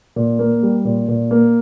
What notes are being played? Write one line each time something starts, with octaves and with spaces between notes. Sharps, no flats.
A#2
A#3
G3
A#2
A#2
A#3